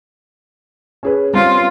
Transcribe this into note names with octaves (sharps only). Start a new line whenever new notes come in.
C#4 G#4 B4
G3 C4 C#4 F4